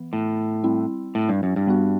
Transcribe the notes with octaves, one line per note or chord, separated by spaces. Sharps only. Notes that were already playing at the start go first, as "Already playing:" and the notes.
Already playing: E3 B3
A2
G3 C4 E4
A2
G2
F#2
G2
G3 B3 F#4